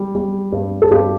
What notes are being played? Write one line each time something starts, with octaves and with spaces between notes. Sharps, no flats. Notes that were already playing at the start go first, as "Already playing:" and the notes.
Already playing: G3
G3
G2
A4
G2 G4